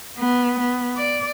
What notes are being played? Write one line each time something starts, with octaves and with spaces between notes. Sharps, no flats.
B3
B3
D5